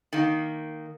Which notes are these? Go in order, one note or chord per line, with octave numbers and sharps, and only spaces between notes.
D#3 A#3